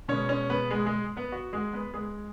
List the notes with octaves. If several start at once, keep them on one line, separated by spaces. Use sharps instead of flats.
B2 G#3 B3 C#4 C#5
C#4 C#5
B3 B4
G#3 G#4
G#3 G#4
B3 B4
F#4
G#3 G#4
B3 B4
G#3 G#4